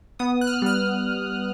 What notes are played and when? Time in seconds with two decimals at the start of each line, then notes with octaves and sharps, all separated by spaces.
0.19 B3 D#6
0.41 F#6
0.47 F6
0.62 G3 F6